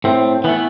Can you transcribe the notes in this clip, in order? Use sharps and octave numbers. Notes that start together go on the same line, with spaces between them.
A2 C4
E3 A3 B3